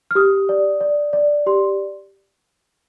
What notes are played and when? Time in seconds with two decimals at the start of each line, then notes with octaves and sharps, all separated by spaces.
0.11 F6
0.15 G4 D#6
0.49 D5
0.81 D5
1.13 D5
1.46 G4 C6